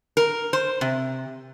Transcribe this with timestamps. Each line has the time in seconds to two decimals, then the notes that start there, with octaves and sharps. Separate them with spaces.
0.17 A#4
0.53 C5
0.81 C3